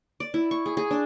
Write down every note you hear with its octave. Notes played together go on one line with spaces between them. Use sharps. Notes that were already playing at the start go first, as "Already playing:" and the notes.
D5
E4
C#6
G#4
G#4
D4